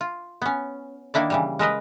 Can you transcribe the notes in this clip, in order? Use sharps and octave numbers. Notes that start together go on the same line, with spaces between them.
F4
B3 C#4
D#3 A#3 D4 E4 D5
C#3 E3 G3
G#3 A#4 B4 D#5